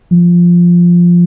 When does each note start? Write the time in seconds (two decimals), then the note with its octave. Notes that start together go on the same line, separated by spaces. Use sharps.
0.11 F3